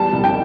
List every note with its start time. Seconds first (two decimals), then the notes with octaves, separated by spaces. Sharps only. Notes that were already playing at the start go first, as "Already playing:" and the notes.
Already playing: E2 G3 A5
0.13 C2
0.24 G5